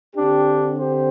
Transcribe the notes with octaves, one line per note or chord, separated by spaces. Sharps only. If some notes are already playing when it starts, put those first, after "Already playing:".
D3 C4 D4 G4
G4 C5